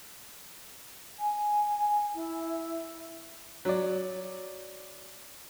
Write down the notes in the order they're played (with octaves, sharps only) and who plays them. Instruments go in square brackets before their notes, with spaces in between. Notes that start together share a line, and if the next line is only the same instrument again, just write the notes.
[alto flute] G#5
E4
[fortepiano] F#3 D5